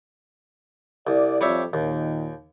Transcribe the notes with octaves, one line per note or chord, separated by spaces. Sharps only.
C2 D5
F2 G3 C#5 E5
D#2 A#2 D#3